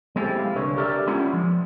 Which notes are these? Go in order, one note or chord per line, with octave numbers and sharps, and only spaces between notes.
G#3 C4 E4 G4 A4
E4 F5
C2 D3 B4 C#5
G4 A4 A#4 D5 E5
G3 G#3 B3 C#4 E4 F4
F3